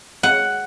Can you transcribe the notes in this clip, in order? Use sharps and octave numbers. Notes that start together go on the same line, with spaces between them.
F#5